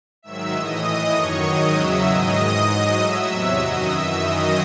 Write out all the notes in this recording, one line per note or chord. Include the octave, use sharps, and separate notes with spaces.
G#2 D#3 F#3 E5 E6
A2 E3 D#5 D#6
A2 E3
F#2 D#3 F#3 C#5 C#6
G#2 D#3 F#3 D#5 D#6
E2 C#3 F#3 E5 E6
G#2 D#3 F#3 D#5 D#6
G#2 E3
G#2 F#3
A2 F#3 E5 E6
E2 C3 F#3 E5 E6
F#2 D#3 F#3 D#5 D#6
F#2 E3 E5 E6
F#2 D#3 F#3 D#5 D#6